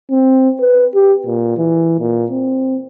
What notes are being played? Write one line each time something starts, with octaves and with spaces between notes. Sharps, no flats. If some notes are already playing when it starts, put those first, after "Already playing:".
C4
B4
G4
A#2
E3
A#2
C4